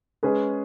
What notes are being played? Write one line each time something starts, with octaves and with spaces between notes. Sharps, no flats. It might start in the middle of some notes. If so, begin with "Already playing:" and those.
G#3 C#4 G#4 B4